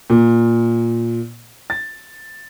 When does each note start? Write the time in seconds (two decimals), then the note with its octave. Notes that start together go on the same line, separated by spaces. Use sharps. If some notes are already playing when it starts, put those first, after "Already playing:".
0.10 A#2
1.70 A6